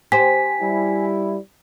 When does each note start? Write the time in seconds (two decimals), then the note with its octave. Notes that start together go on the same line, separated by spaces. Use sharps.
0.12 G4 C5 G#5 B6
0.61 G3 E4